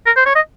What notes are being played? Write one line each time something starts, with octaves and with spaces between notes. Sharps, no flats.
A#4
C5
C#5
D#5